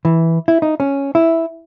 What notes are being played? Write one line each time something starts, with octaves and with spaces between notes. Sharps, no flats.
E3
E4
D#4
C#4
E4